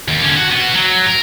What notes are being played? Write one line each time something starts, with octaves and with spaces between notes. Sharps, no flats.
D#2
D3 C#4
F#4
B3 F#4
F#3
A#4